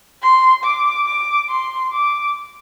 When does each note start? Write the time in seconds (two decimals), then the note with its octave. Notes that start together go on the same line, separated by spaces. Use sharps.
0.22 C6
0.64 D6
1.06 D6
1.49 C6
1.93 D6